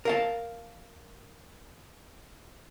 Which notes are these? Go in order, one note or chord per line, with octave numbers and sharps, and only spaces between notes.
A#4 F5 A5